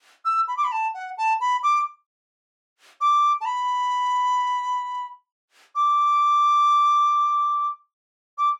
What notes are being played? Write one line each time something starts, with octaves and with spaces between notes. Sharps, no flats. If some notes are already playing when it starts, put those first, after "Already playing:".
E6
B5
D6
B5
A5
F#5
A5
B5
D6
D6
A5
B5
D6
D6